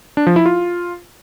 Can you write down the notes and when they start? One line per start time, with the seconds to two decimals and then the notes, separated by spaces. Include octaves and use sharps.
0.17 D4
0.27 F3
0.36 E4
0.46 F4